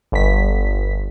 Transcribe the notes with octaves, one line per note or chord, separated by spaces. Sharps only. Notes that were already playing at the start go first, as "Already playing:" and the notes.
G1 B6